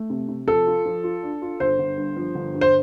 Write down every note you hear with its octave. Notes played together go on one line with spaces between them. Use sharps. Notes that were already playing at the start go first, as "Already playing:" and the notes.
Already playing: A3
C3
C3
F3 A4
F4
F3
F4
D4
F4
G1 C5
G1
G2
F3
G1
G2
C5